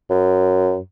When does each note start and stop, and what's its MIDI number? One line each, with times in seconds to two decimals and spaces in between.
0.10 0.78 42